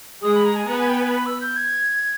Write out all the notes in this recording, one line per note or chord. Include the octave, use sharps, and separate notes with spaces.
G#3 G#4 D#6
B5
A#5
G#5
B3 B4 A#5
G#5
G5
G#5
B5
E6
G6
G#6